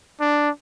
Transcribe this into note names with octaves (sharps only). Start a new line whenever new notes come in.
D4